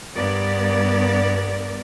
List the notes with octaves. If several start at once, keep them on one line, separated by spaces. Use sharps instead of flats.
G2 B3 A#4 D5